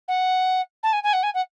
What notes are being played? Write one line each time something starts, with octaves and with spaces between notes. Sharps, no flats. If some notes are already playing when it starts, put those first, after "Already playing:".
F#5
A5
G#5
G#5
F#5
G#5
F#5